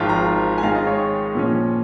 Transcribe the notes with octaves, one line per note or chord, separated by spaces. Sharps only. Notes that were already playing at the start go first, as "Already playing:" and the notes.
Already playing: G#1 G#2 F3 G#3 F4
A#5
G#5
G#2 D#3 G#3 F4 F5
D#5
C#5
A#2 F3 C#4